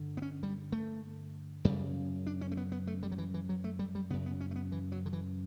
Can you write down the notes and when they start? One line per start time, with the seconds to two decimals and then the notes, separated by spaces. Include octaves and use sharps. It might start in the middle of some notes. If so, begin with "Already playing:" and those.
Already playing: G2 D3
0.17 B3
0.22 C#4
0.43 G3
0.72 A3
1.65 F#2 C#3 G3
2.27 D4
2.41 C#4
2.52 A3
2.57 B3
2.72 B3
2.87 A3
3.03 G3
3.12 F#3
3.18 E3
3.34 E3
3.49 F#3
3.64 A3
3.79 G3
3.95 G3
4.10 C#3 B3
4.13 F#2
4.26 B3
4.41 C#4
4.51 A3
4.56 B3
4.72 E3
4.92 F#3
5.06 D3
5.13 E3